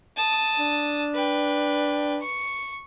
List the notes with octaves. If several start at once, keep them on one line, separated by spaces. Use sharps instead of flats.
A5 D#6
D4
B4 G5
C#6